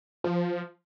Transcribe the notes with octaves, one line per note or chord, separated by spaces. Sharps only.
F3